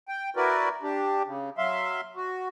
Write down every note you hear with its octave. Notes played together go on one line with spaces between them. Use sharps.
G5
E4 F#4 A#4 B4 D5
D4 G4
C#3
F#3 E5 F5 C6
F#4